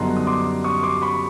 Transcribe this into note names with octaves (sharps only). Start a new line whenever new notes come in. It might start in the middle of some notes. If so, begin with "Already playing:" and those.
Already playing: F#2 D3 G3 B3 D#4 A#5 C6
D#6
C6 D6
C#6 D#6
C6 D6
B5 C#6